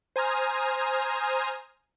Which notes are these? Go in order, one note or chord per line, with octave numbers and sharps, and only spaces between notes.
C5 G#5 A#5 D#6 F6